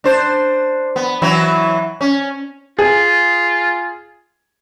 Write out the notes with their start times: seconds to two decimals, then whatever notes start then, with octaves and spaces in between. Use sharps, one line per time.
0.04 D4 C5
0.96 B3
1.22 E3 F#3 E4
2.01 C#4
2.79 F4 G#4